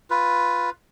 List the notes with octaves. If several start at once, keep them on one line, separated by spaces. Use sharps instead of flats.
F4 B4